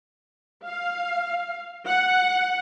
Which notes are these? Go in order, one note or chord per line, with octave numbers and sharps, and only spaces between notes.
F5
F#5